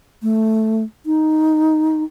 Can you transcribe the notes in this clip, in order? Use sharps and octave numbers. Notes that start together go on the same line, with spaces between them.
A3
D#4